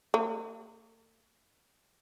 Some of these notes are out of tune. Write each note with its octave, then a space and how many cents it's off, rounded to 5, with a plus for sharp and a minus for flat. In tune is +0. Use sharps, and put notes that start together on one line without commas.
A3 +45